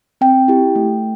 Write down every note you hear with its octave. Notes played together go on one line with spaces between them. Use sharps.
C4 G5
E4 G4
A3